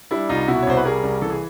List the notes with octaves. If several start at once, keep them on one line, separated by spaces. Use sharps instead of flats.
G3 D4 E4
C2 D#4 F4
B2 E4 F#4
C#5
C2 C5
B4
G3 G#4 A#4
C2
E3 A4
G#4